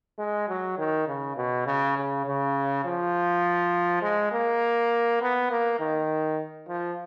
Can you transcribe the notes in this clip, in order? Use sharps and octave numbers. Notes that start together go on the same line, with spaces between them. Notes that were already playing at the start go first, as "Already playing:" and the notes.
G#3
F#3
D#3
C#3
B2
C#3
C#3
C#3
F3
G#3
A#3
B3
A#3
D#3
F3